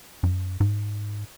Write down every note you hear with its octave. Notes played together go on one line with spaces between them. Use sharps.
F#2
G#2